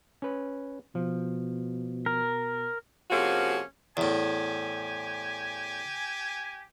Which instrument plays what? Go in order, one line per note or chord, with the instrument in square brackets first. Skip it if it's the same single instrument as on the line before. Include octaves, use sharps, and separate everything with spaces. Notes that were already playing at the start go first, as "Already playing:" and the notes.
[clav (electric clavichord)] C#4 B4
[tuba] B2 [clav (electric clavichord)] F3
[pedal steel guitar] A#4
[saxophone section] C3 F3 A#3 C#4 F#4 G#4
[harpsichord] E2 A2 [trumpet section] G4 G#5